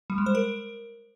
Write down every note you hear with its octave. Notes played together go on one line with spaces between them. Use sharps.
G3
G#3
C5
A#4